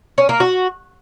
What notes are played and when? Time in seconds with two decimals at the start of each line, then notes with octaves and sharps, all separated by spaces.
0.18 C#4
0.29 A#3
0.40 F#4